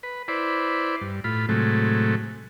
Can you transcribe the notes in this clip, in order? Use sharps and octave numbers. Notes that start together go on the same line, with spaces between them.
B4
E4 B4 C5 D5
G2
A2 F4 B5
A2 C3 F#3 G#3 A3